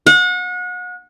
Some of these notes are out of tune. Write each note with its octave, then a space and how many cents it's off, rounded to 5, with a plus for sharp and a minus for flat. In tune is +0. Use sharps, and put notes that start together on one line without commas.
F#5 -35